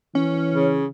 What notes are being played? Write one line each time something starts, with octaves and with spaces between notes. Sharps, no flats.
E3 C#4
C#3